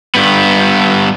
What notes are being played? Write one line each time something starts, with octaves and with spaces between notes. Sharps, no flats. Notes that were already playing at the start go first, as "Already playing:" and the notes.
G2 B3